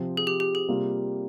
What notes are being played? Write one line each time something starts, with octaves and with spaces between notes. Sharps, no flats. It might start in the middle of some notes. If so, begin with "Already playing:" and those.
Already playing: C3 F3 C4
G#4
G4
G4
G#4
C3 G3 A#3 F4